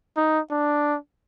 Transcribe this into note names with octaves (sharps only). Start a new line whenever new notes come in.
D#4
D4